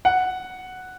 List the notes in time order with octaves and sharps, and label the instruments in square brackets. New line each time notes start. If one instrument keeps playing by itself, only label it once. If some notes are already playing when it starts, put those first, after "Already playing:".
[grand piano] F#5